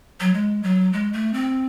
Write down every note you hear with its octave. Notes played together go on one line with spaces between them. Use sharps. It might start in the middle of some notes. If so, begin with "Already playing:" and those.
F#3
G#3
F#3
G#3
A3
C4